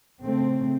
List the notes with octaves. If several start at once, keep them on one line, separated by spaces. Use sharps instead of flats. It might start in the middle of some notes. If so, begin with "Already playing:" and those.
C#3 A3 C4